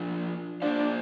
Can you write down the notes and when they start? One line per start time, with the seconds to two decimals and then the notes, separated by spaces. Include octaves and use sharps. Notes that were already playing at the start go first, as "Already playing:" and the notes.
Already playing: F3 D4 F4
0.62 A#3 D4 F4 C5 F5